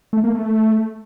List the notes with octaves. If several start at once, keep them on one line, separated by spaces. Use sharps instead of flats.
A3
A#3
A3